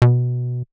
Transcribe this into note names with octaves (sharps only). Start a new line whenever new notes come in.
B2